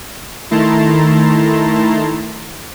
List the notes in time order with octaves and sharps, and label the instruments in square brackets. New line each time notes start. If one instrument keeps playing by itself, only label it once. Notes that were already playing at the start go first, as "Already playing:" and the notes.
[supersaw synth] D#3 A3 E4 A5 A#5 C6